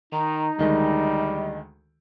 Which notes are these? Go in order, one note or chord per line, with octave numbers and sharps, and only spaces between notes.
D#3 D#4 A#5
D2 D#3 G3 G#3 D#5